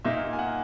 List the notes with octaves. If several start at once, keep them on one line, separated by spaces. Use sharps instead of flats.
A#2 A#3 D#4 E5
G#5
F#5